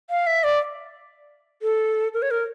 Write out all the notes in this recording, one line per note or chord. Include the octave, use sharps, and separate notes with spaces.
F5
E5
D5
A4
A#4
C#5
A#4